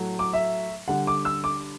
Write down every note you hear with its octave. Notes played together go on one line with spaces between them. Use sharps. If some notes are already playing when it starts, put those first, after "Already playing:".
Already playing: A2 F#3 A3
D6
E5
D3 G3 F#5
D6
E6
D6